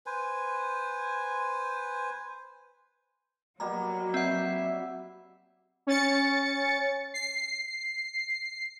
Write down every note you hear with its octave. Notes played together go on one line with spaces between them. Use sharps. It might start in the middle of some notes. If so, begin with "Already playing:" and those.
B4 C5 G#5
B2 F#3 G3 A#3 A#5
C4 E5 F#5
C#4 A6 C#7
C7